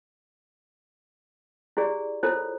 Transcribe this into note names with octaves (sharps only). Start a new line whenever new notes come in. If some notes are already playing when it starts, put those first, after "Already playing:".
E4 G4 G#4 D5
E4 F4 A4 A#4 C5 C#5